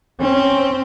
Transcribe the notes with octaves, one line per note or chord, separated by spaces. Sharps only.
C4 C#4